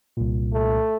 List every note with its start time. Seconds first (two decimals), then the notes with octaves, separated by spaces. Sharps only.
0.17 C2 A#2
0.53 A3